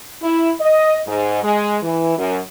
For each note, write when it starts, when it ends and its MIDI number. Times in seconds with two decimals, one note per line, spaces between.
0.22 0.52 64
0.60 0.99 75
1.07 1.41 44
1.43 1.77 56
1.82 2.15 52
2.18 2.39 42